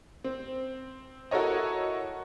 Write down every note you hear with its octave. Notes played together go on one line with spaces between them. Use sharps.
C4
E4 F#4 A4 A#4 C#5 D#5